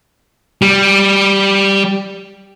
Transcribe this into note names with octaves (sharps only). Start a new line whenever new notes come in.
G3